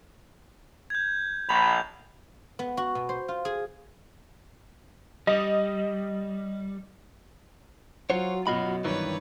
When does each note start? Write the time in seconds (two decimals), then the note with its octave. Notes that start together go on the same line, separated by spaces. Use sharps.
0.90 G6 G#6
1.49 A#1 B5 G6 F7
2.59 B3
2.77 F#4
2.95 B2
3.09 C5
3.28 F4
3.45 G#4
5.27 G3 D#5
8.10 F#3 F4 F#4 C5 C#5
8.47 F#2 B2 F#3 F4 F#4 D#5 B5
8.84 G2 D#3 E3 B4 C#5 D5